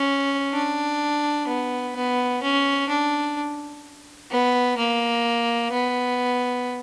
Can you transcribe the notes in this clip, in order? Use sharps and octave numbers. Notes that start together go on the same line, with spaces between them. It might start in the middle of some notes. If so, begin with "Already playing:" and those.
Already playing: C#4
D4
B3
B3
C#4
D4
B3
A#3
B3